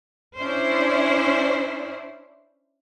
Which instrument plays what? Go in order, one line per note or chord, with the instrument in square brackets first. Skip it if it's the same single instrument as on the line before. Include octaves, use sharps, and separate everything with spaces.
[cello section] C#4 D4 E4 C5